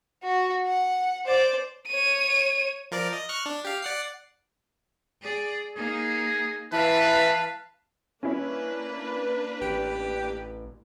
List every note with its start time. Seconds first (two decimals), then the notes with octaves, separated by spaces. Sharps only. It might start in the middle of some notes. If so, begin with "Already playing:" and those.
0.23 F#4
0.66 F#5
1.25 C5 D5
1.87 C#5 D#7
2.91 F3 A#4 D5
3.13 D#5
3.29 C#6 F6 F#6
3.46 D4
3.65 G4 F5
3.82 D5 F#5 C7
5.21 G#4 D5
5.76 A#3 D#4 G#4
6.73 E3 B4 F5 A5
8.23 A#3 C#4 D4 E4 B4 C#5
9.61 A1 G4